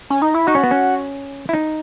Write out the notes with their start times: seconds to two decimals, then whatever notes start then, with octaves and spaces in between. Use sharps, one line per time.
0.10 C#4
0.22 D#4
0.34 E4
0.47 D#4 F#4
0.55 C#4
0.64 B3
0.71 C#4
1.49 E4
1.53 D#4